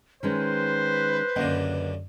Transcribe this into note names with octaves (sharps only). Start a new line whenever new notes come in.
D#3 G#3 C#4 B4 C5
C#2 F#2 D3 A#3 D#5 F#5